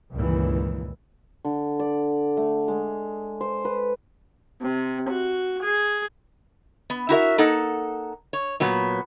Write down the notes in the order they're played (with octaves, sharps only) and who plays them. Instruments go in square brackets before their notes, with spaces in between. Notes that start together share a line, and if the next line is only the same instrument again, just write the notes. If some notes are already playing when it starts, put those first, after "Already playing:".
[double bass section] C#2 G2 A#2 D#3 E3
[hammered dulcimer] D3
D5
A3
G#3
C5
B4
[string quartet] C3
F#4
G#4
[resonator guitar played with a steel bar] B3
E4 F#4 A#4 E5
A#3 D#4 A4 F#5
C#5
A#2 F#3 B3